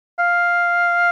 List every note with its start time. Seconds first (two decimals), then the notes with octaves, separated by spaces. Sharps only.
0.19 F5